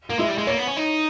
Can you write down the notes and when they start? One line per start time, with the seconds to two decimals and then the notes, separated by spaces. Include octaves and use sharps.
0.10 A#3
0.19 G#3 E4
0.28 G3
0.38 G#3
0.47 A#3 C#5
0.57 B3
0.67 C#4
0.77 D#4